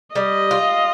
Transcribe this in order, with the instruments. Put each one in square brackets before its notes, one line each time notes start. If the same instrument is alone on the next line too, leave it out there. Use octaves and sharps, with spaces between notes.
[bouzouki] G3 [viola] D#5
[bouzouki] F4